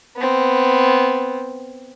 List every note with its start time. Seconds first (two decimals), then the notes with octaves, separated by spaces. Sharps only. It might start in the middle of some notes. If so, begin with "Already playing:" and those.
0.16 B3 C4